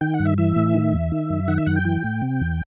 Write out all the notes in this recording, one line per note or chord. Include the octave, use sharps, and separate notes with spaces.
D#3 G5
F#5
G2
E5
E3 E5
A2
D#3
E2
D#3
F#2
D#3 F#5
E5
F#2 F#5
G5
E3
A2
C3
E2